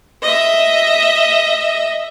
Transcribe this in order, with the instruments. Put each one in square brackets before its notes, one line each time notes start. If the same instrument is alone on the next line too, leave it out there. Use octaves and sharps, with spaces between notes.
[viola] D#5 E5